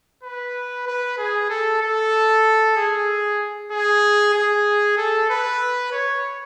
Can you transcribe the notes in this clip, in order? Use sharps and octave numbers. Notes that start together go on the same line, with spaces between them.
B4
B4
G#4
A4
A4
G#4
G#4
G#4
A4
B4
C#5